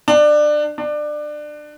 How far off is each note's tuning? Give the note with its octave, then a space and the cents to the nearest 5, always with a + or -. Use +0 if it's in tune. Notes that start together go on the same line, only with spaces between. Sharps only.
D4 +25
D4 +25